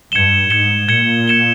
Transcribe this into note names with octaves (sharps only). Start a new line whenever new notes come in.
G2 G#6 C#7 E7 G7
G#2 G#6 C#7 E7 G7
A#2 G#6 C#7 E7 G7
G#6 C#7 E7 G7